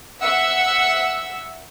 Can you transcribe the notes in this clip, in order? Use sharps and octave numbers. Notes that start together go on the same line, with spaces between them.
E5 F#5 E6